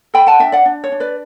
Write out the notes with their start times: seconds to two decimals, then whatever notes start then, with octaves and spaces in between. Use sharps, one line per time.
0.14 A4 G5 B5
0.27 F#5 A5
0.39 D4 E5 G5
0.52 D5 F#5
0.65 D4
0.84 C#5
0.92 D4
1.00 B4 D5